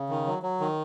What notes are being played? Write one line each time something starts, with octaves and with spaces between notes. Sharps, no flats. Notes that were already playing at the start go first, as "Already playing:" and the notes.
Already playing: C#3
D#3
F#3
F#3
D#3